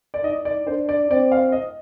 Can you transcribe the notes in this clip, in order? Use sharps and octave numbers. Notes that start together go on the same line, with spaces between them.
D5
D#4 D#5
D5
D4 C5
D5
C4 D5
F5
D#5